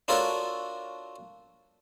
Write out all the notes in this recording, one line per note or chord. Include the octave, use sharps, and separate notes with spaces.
D4 F4 F#4 A4 A#4 C#5